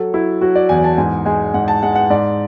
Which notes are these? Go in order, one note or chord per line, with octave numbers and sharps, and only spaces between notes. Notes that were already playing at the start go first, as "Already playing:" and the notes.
Already playing: F#3 A4
F#3 E4
F#3 F#4
D5
E2 G#5
A5
G#2 G#5
G#3 G#5
G#2 F#5
A5
G#3 F#5
F#5
G#2 D5